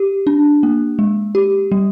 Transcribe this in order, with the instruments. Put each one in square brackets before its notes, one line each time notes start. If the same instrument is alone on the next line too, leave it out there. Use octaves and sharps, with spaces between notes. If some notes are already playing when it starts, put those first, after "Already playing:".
Already playing: [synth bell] G4
D4
A#3
G#3
G4
G3